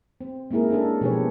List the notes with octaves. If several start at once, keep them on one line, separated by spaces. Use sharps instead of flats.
C4
G#3 A#3 C#4 E4 G#4 A#4
C#4 D4 A4
B2 F3 G4 G#4 B4 C#5